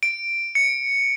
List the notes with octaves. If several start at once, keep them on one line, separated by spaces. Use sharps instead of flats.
D7
C#7